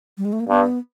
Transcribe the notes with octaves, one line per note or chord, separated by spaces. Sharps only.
G3
G#3
A3
A#3
G2 B3